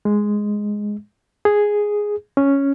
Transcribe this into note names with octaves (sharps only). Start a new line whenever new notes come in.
G#3
G#4
C#4